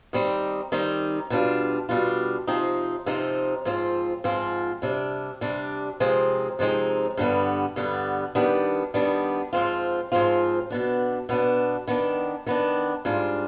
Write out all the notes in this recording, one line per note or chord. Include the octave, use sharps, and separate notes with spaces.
D#3 G3 C4 D#4
D#3 G3 C4 D#4
B2 G3 D4 F4
B2 G3 D4 F4
C3 F3 C4 D#4
C3 F3 C4 D#4
G#2 F3 C4 F4
G#2 F3 C4 F4
C3 G3 D4
C3 G3 D4
C3 F3 G#3 C4 D#4
C3 F3 G#3 C4 D#4
G2 D3 G3 B3
G2 D3 G3 B3
D#3 G3 B3 D4
D#3 G3 B3 D4
G#2 F3 C4 F4
G#2 F3 C4 F4
B2 B3 D4
B2 B3 D4
D#3 B3 D4
D#3 B3 D4
G#2 G3 D4 F4